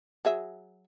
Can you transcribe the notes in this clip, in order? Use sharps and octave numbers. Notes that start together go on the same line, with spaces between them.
F#3 G#4 E5